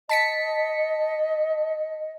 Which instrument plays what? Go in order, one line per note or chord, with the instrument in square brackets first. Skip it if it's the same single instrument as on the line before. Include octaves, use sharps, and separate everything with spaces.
[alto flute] D#5 [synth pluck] A5 B6 C#7